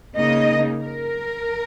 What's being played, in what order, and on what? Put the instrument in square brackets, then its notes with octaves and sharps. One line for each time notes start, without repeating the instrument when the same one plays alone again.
[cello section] C#3 A#3 D#4 D#5
A#4